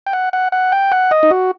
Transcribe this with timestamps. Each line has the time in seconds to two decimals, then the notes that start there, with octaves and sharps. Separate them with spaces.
0.07 G5
0.13 F#5
0.33 F#5
0.52 F#5
0.72 G5
0.92 F#5
1.11 D#5
1.23 D#4
1.31 F#4